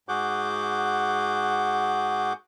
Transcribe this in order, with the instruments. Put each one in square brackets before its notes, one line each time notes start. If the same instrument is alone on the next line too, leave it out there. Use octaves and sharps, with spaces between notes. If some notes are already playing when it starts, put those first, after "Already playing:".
[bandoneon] G#2 F#4 G#4 F#5 D6 G6